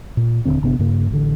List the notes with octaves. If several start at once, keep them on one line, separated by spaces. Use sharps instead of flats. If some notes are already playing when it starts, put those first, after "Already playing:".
A#2
D#1 C2 D3 C4
G1 C3 B3 D4
G2 C#3 A#3
A1 D3